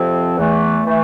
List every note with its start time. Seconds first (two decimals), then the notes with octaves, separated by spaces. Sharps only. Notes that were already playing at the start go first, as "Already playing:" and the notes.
Already playing: F2 C3 F3 C4
0.35 E2 E3 A3
0.86 E3 A3